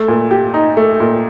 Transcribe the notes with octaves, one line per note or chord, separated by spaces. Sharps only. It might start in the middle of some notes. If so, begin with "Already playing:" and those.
Already playing: A3
A#2
G4
D#4
A3
A#2